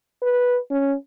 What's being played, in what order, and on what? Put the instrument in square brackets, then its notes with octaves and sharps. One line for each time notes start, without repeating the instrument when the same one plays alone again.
[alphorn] B4
C#4